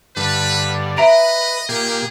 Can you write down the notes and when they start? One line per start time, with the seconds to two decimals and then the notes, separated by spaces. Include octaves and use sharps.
0.16 G2 D3 B4
0.97 B4 D#5 E5 A#5 D7
1.69 A#2 G4 G#4